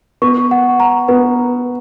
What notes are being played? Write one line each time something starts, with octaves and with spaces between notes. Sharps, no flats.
B3 C#6
F#5
A#5
B3 B4